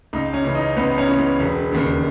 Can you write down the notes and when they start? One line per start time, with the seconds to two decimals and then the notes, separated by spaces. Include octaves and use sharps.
0.13 C#2 D#4
0.33 C#4
0.44 C#3 E3
0.55 D#4
0.76 C#2 B3
0.98 C#4
1.09 C#3 E3
1.18 B3
1.40 E1
1.72 D#2 C#3